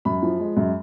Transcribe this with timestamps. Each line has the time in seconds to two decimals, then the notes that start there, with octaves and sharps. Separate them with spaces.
0.05 F#2 B5
0.23 F3
0.40 G#3
0.57 F#2